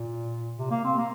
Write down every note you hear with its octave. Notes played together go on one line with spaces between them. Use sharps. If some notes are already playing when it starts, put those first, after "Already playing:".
Already playing: A#2
C3
A#3
C4
A#3